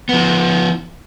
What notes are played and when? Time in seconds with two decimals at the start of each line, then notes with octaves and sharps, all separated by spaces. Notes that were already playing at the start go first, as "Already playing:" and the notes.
0.09 F3 B3